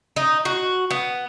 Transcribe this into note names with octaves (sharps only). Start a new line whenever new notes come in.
D#4
F#4
B3